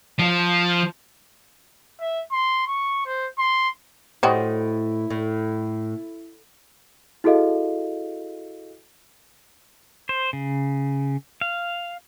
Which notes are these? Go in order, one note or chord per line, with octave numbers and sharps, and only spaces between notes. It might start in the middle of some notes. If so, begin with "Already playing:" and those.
F3
E5
C6
C#6
C5
C6
A2 F#3 E4 F#4 G4 C5 D#5
A2
E4 F#4 G#4 A4 D#5 F5
C5
C#3
F5